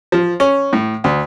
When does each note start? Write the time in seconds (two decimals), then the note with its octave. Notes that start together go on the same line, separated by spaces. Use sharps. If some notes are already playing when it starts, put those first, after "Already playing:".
0.12 F3
0.40 C#4
0.73 A2
1.04 D2